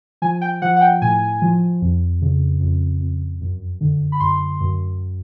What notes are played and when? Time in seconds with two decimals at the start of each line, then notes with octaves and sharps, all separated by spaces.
0.22 F3 G#5
0.41 G5
0.62 F3 F#5
0.76 F#5
0.81 G5
1.02 A2 G#5
1.42 F3
1.82 F2
2.22 C#3
2.60 F2
3.00 F2
3.41 F#2
3.81 D3
4.12 B5
4.20 F#2 C6
4.61 F#2